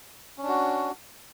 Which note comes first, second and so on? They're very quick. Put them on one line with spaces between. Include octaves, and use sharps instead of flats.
C#4 D4 F#4